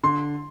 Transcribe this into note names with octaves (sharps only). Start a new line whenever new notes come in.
D3 C6